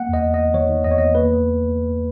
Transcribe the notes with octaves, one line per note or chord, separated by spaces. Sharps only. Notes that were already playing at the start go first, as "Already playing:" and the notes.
Already playing: A#3 F#5
E2 D#5
E2
E2 D#5
D#3 C#5
D#3
E2 D#5
C#5
E2 D#5
A#3 B4
A#3